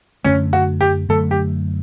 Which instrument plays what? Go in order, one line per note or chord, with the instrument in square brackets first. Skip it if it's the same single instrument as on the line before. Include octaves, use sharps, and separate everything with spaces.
[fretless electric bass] F#2 D3 A3 [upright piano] C#4
[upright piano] F#4
G4
[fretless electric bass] F#2 D3 A3 [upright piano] A4
[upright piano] G4